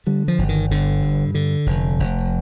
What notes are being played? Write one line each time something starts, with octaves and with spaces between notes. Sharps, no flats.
D3 G3
F3
G1
D#3
G1 D3
G2
D3
F1
F1